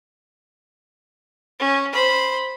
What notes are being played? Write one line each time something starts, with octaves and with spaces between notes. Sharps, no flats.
C#4
C5 B5